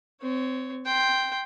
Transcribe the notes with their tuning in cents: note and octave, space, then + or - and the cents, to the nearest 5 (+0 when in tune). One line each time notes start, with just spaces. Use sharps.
C4 -20 C#5 +10
G5 +0 C6 +0